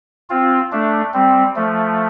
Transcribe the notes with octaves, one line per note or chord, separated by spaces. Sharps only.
C4 F4
A3 D4
G3 C4
F3 A3